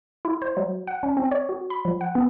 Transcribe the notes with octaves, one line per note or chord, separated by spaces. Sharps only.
E4
C5
F#3
F#5
C#4
C4
C#5
F#4
B5
F3
F#5
B3